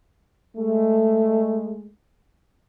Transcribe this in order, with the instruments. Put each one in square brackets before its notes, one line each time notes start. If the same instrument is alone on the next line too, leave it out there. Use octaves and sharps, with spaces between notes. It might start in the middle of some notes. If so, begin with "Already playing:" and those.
[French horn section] G#3 A3